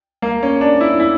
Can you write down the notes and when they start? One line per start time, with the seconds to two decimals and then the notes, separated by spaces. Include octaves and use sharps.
0.22 A#3
0.43 C#4
0.61 D4
0.81 E4
1.00 E4